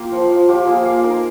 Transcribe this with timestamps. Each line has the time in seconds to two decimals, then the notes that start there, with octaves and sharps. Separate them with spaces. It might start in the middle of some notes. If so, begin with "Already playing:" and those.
Already playing: A#3 F4 G4
0.12 F3
0.30 F3
0.48 F3 G4
0.67 A#3 G#4
0.85 A#3 F5
1.03 D#4 A#4